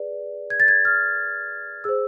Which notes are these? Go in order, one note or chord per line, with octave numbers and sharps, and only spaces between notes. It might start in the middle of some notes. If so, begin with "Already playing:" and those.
Already playing: G#4 B4 D5
G#6
A6
G#6
F6
G#4 C5 E6